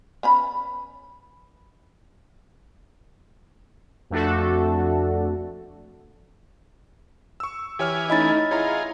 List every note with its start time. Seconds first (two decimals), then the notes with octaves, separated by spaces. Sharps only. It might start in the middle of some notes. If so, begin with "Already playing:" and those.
0.23 B3 C#4 B5
4.10 F2 A3 D4 F#4 A4
7.40 C#6 E6
7.79 E3 G4 C#5 G#5 F6
8.10 A3 C#4 D#4 E4 D#5 B5 A6
8.51 E4 F4 G#4 C#5 A#5